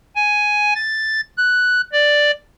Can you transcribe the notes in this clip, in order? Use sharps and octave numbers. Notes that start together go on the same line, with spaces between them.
G#5
A6
F#6
D5